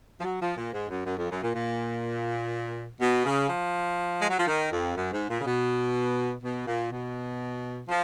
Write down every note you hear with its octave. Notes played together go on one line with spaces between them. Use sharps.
F3
F#3
F3
A#2
G#2
F#2
F#2
F2
F#2
A#2
A#2
B2
C#3
F3
G#3
F#3
F3
D#3
F2
F#2
G#2
A#2
C#3
B2
B2
A#2
B2
F3